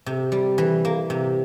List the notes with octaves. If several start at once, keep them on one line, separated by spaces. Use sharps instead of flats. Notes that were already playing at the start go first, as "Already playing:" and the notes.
C3
G3
E3
A#3
C3